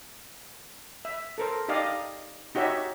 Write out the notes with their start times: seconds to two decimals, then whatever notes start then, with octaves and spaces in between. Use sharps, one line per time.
1.05 E5
1.38 A4 A#4 C5
1.68 D#4 G4 D5 D#5 F5
2.55 D#4 F#4 G4 C#5 E5